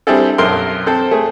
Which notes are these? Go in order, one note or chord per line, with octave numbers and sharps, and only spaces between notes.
G3 C4 D4 E4 G#4 A4
B1 F#2 A4 A#4 C6
C4 A4 C5
A3 G#4